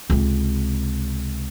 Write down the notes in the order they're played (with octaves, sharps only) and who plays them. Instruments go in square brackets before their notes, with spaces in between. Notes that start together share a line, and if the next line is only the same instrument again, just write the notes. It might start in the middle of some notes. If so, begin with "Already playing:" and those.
[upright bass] C#2 C3